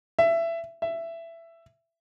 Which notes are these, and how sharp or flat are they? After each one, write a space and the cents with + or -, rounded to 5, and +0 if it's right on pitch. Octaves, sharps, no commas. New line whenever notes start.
E5 +20
E5 +15